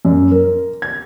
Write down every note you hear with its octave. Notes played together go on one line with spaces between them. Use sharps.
F#2
A#4
G#6